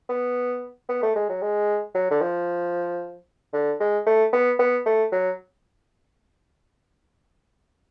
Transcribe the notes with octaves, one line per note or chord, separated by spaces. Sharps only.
B3
B3
A3
G#3
F#3
G#3
F#3
D3
F3
D3
G#3
A3
B3
B3
A3
F#3